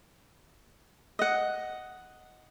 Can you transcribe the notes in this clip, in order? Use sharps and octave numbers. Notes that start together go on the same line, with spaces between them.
D#5 F#5